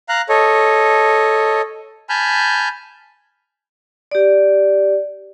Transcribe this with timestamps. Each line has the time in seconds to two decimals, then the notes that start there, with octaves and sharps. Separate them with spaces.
0.09 F5 A#5 F#6
0.29 A4 C#5 D#5
2.09 G#5 A5 B5 F6 G6
4.11 G4 D5